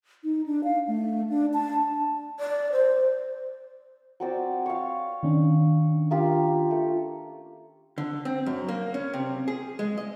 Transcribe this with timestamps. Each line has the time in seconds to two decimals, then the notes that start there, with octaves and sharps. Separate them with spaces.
0.24 D#4
0.46 D4
0.64 F5
0.87 A3
1.30 D4
1.54 A5
2.39 D5
2.72 C5
4.20 F#3 C4 D5
4.66 C#5 F5
5.23 D#3 C#4 D4
6.11 A#3 F4 G4
6.71 A3
7.98 D3
8.25 C4
8.46 F#2
8.68 A#3
8.94 C#4
9.13 C3
9.48 G#4
9.79 G#3
9.97 D#5